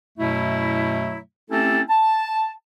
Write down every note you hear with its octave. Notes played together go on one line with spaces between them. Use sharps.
F#2 B2 F#3 A3 E4
A3 C4 C#4 E4 G4 A4
A5